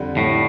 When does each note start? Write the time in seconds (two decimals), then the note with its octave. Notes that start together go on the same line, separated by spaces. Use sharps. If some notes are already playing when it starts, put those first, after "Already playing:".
Already playing: F2 D3 G3
0.17 A2